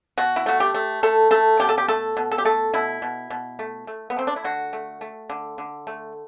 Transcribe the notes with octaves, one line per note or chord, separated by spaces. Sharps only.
B2 F#4
E4
A3 F#4
G4
A3
A3 A4
A3 A4
B2 G4
A4
G4
A3 A4
B2
A4
G4
A3 A4
B2 E4
B2
B2
A3
A3
B3
A3 C4
D4
E4
D3 F#4
A3
A3
D3
D3
A3